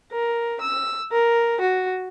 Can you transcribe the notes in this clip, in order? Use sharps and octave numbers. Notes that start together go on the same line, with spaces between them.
A#4
E6
A#4
F#4